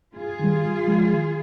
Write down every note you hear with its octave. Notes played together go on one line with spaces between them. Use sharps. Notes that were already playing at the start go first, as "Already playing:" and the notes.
G2 F4 G#4
D#3 G3
G#2
F3 G#3
D#3